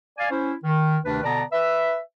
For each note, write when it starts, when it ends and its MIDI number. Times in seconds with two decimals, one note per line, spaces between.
0.18 0.28 74
0.18 0.28 77
0.18 0.28 80
0.31 0.53 61
0.31 0.53 64
0.31 0.53 72
0.64 0.97 51
1.05 1.20 38
1.05 1.20 48
1.05 1.20 51
1.05 1.20 62
1.05 1.20 71
1.24 1.43 47
1.24 1.43 50
1.24 1.43 59
1.24 1.43 74
1.24 1.43 81
1.24 1.43 82
1.53 1.99 71
1.53 1.99 76